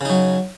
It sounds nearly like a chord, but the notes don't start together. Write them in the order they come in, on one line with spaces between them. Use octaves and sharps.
C#3 D#4 F#3